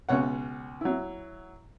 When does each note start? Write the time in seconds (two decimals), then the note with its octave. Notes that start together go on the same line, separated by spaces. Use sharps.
0.09 C#2 B2 C#5 F#5
0.81 F#3 E4